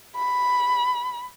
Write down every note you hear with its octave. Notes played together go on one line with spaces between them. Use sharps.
B5